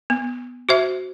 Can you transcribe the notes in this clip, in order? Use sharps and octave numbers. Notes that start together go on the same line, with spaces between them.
B3
F#4 C5 E5